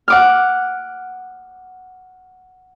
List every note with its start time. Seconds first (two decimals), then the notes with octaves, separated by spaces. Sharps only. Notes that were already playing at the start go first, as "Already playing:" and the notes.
0.08 F#5 D6 F6